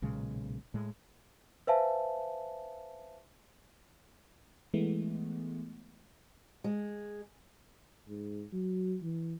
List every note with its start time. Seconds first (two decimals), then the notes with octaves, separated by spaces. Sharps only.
0.02 B1 A#2 C#3 G#3
0.74 A2 G#3
1.67 B4 C5 E5 F5 G#5 A5
4.74 E3 G#3 A3 B3
6.64 G#3
8.08 G#2
8.52 F#3
9.02 E3